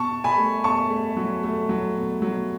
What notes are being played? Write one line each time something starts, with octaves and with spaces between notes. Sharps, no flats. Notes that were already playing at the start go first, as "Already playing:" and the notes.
Already playing: B2 A5 C#6
B2
G#5 B5
A3
B2 A5 C#6
A3
F#3
A3
F#3
B2
F#3